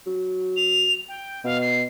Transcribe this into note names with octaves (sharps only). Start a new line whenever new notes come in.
F#3
F7
G5
B2 F5
C7